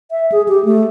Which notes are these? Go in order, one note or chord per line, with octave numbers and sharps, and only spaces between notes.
E5
G#4
G4
A3